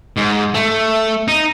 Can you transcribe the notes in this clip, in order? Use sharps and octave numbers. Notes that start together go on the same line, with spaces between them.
G#2
A3
D#4